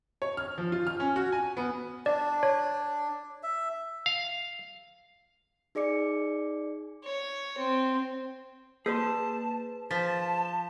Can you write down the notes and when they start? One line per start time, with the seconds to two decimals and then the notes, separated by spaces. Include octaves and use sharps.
0.22 C#5
0.37 F6
0.58 F3
0.72 F4
0.87 F6
1.00 C#4
1.16 F#4
1.32 G#5
1.57 B3
2.06 D4 D5
2.43 C#5
3.43 E5
4.06 F5
5.75 D#4 G#4 D5 D6 C#7
7.04 C#5
7.58 C4
8.86 A#3 G#4 B4 C5 A5
9.91 F3 A5 A6 B6